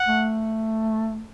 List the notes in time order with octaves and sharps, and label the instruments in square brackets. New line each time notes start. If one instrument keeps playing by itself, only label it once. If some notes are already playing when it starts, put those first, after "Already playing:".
Already playing: [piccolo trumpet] F#5
[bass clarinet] A3